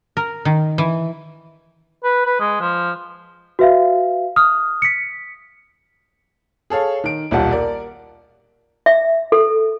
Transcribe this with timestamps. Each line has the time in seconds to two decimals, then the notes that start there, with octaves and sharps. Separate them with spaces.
0.17 A#4
0.45 D#3
0.78 E3
2.04 B4
2.26 B4
2.40 G#3
2.61 F3
3.59 F#4 B4 E5 F5
4.36 D#6 F6
4.82 B6 C#7
6.70 G#4 A4 C#5 F5
7.04 D#3 D7
7.31 D#1 B1 G3 F4 F#5 A5
7.51 A#4 D5
8.86 E5
9.32 A4